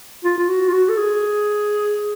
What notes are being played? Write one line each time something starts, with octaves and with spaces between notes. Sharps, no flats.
F4
F4
F#4
F4
F#4
A4
G#4